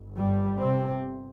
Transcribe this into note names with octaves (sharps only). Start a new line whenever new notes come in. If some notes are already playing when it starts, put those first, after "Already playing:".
Already playing: G1
G2 G3
C3 C4